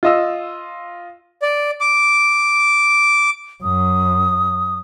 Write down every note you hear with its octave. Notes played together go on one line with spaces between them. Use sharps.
F4 D#5 E6
D5
D6
F#2 D#6